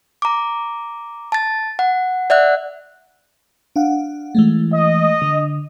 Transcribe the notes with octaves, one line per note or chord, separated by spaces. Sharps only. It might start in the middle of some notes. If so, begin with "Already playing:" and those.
A#5 D6
A5 A6
F#5
D5 E5 F#5 F#6
D4 F5 F#5
E3 G#3 A3
D#5
D3